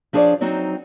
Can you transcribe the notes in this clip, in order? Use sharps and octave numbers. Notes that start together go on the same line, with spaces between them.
F3 D4 G#4 A4 C#5 D5
F#3 C4 D#4 F#4